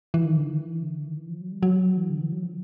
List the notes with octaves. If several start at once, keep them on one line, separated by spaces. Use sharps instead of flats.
E3
D#3
D3
D#3
E3
D3
D#3
E3
F3
F#3
G3
F#3
E3
D3
E3
F#3
F3